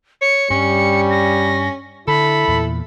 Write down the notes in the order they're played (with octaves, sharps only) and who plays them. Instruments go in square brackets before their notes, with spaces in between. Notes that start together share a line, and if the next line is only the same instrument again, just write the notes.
[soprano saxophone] C#5 [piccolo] C#7
[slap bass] G2 [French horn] G3 [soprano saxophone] C#4
[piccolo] A#6
[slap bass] D3 [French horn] E4 [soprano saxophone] A4 [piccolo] B5
[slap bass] E2 A#2